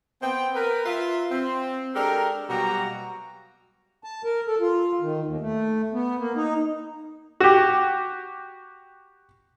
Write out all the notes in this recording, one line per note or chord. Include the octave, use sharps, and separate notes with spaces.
B3 C4 G5
A#4 B4
F4 E5
C4
G#3 D4 G4 A4 A#4
B2 F#3 G3 A#3 F#4 A#5
A5
A#4
A4
F4
D#3
D#2
A3
B3
A#3
D#4
F#4 G4